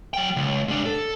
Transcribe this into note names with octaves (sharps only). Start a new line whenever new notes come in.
F#3 G5
C#2
G#2 D4
A4